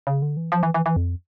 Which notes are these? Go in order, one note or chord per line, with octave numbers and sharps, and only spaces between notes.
C#3
D3
E3
F3
E3
E3
E3
F2